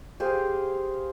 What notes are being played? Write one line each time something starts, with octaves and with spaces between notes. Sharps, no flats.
G4 G#4 C5 F5